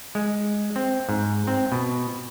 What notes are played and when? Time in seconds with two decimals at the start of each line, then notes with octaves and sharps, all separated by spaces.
0.15 G#3
0.76 C4
1.09 G#2
1.47 C4
1.72 B2